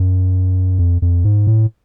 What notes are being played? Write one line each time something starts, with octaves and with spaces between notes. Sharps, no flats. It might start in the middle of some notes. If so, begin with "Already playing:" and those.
Already playing: F#2
F2
F2
G#2
A2